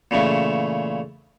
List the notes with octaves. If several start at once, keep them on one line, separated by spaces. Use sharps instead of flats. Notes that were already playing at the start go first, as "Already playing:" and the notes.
A#2 C#3 E3 A3